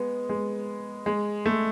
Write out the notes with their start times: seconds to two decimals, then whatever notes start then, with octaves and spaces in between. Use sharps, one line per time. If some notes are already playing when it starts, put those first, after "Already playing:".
Already playing: G#3 B3
0.29 G#3
1.06 G#3
1.46 A3